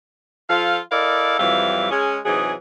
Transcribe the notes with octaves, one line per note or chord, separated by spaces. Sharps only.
F3 F4 A4 F5
E4 A4 A#4 D5 D#5 F5
F2 E3 F#3 G3 E5 F5
G#3 C#4 G#4
C3 E3 F#3 D#4 G#4